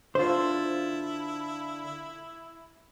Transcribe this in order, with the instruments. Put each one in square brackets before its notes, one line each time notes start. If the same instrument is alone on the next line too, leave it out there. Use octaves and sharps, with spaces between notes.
[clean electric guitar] D3 [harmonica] E4 [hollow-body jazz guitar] F4 C5